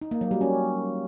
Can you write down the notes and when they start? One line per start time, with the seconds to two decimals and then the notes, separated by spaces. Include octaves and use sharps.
0.02 D#4
0.11 A#3
0.21 F#3
0.31 G3
0.41 C#4